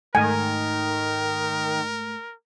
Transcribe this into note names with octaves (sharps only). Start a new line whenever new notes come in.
G#2 D#3 A3 A#4 G#5